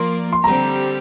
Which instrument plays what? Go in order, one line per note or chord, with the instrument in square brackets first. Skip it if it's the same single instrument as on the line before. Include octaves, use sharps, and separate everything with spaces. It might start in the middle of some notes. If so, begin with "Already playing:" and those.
Already playing: [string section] F3 A#3 F4 A#4 D5 [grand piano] C6
[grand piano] C6
[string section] D3 G3 C4 G4 [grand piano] A#5